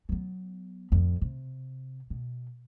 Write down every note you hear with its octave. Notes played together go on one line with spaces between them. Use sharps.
F#3 B3
A1 F2
C3
B2